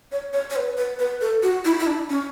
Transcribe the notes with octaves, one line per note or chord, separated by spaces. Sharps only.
C#5
C#5
C#5
B4
B4
B4
A4
F#4
E4
E4
D4
C#4